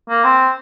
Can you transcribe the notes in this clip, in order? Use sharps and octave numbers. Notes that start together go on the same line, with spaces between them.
A#3
C4